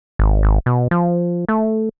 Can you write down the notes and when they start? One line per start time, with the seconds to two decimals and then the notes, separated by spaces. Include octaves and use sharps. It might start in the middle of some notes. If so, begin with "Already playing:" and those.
0.19 G#1
0.43 G#1
0.66 B2
0.91 F3
1.48 A3